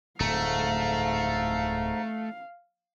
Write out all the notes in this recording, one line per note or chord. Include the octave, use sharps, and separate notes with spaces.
D1 F2 G#2 A3 F5 A#5